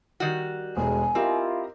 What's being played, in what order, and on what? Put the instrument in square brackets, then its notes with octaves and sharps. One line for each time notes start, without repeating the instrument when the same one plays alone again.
[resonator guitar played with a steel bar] D#3 G3 F#4
[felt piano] E1 [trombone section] A2 G#3 [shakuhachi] G#5
[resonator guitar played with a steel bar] C4 [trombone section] E4 F4 [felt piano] G4 A#4 D#5